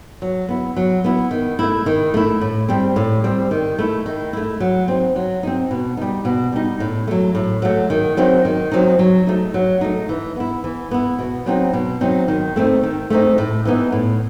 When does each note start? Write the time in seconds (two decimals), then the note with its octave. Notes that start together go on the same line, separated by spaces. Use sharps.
0.22 F#3
0.49 B3 E4
0.76 F#3
1.04 B3 E4
1.31 D#3
1.59 A3 E4
1.86 D#3
2.14 A3 E4
2.41 A2
2.68 G3 C4
2.96 A2
3.24 G3 C4
3.51 D#3
3.79 A3 E4
4.06 D#3
4.33 A3 E4
4.60 F#3
4.88 C4 D#4
5.16 F#3
5.43 C4 D#4
5.71 B2
5.97 G3 D#4
6.25 B2
6.52 G3 D#4
6.80 A2
7.07 F#3 A3
7.35 A2
7.62 F#3 A3
7.90 D#3
8.17 F#3 C4 D#4
8.45 D#3
8.71 F#3 C4 D#4
8.99 F#3
9.27 A3 D#4
9.54 F#3
9.81 A3 D#4
10.09 E3
10.36 B3 E4
10.64 E3
10.91 B3 E4
11.19 B2
11.46 F#3 C4 D#4
11.73 B2
12.01 F#3 C4 D#4
12.28 D#3
12.56 A3 C4 D#4
12.83 D#3
13.10 A3 C4 D#4
13.38 A2
13.65 E3 B3 D#4
13.92 A2